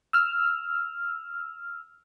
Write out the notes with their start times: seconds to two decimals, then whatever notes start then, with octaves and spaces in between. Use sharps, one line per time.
0.13 E6 F6